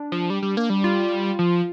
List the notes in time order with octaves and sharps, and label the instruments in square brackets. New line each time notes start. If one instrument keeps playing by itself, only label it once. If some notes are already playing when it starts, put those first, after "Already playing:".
Already playing: [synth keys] D4
[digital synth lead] F3
G3
G3
A#3
G3
[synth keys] F4
[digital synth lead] F3